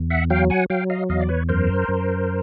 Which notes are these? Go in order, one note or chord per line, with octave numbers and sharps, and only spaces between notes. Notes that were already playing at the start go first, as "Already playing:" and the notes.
Already playing: E2
E5 F#5
F#3 F5 G5
F#5 G#5
F#3 F5 G5
D#5 F5
E2 D#5 F5
D5
B4 C#5
F#2 A#4 C5
F#2